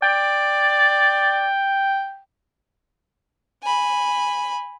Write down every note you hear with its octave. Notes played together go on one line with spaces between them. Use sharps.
D5 G5
G#5 B5